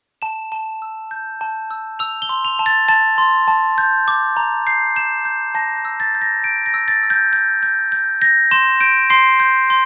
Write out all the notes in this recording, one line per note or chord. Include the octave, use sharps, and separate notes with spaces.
A5 E7
A5
E6
G6
A5
E6
E6 F7
G7
C6
F7
A5
A6
A5 A6
C6
A5
G6
D6
A#5
G6 C7
G6 E7
G6
A5 A#6
G6
E6
A6
G6
A#6
G6 D7
A#6
E6
A6
E6
G6
G6
G6
G6
G6 A#6
C6 E7
G6 D7
C6 C7
G6
C6